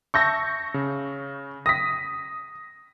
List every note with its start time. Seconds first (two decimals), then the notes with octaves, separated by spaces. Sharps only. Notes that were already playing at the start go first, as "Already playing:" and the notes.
0.14 E5 A5 C#6 E6 G6 A#6
0.74 C#3
1.66 D#6 A#6 B6